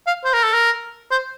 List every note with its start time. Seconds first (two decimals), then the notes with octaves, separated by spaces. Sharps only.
0.07 F5
0.25 C5
0.34 A#4
0.44 A4
0.53 A#4
1.11 C5